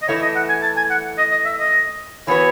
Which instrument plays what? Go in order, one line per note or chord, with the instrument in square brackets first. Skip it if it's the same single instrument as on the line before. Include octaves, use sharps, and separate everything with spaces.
[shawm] D#5
[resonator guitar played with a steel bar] E3 A3 E4 [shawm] C#5
[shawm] D#5
F#5
G#5
A5
G#5
F#5
D#5
D#5
E5
D#5
[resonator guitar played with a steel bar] E3 B3 F#4 B4 [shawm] C#5